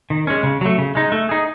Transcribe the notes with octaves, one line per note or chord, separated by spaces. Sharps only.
D#3
G#3 C#4
C#3
F#3 A3
C#3
G#3 D#4
A3
D#4 G#4